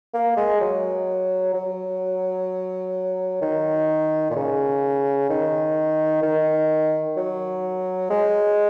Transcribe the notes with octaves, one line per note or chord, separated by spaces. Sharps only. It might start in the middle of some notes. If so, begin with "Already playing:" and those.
A#3
G#3
F#3
F#3
D#3
A#2
C#3
D#3
D#3
F#3
G#3